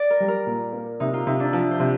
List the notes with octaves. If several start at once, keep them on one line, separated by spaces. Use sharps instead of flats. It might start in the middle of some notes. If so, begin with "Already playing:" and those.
Already playing: D5
A#4
G3
A#4
A#2
A#3
C3 D#4
F4
C3 D#4
D4
F3
C5
C3